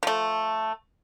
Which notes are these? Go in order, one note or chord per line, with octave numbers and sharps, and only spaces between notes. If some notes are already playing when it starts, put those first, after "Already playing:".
F3 A3